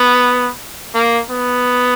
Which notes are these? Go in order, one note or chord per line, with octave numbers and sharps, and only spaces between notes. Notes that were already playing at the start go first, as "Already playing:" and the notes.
Already playing: B3
A#3
B3